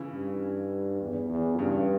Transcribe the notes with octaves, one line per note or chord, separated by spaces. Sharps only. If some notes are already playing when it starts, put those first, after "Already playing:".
Already playing: C#3 E3
G2
E2
E2
G2 C#3